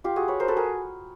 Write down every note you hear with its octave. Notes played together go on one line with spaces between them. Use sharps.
F4 G4
F#4 G#4
B4 C#5
A#4 C5
A4 B4
G#4 A#4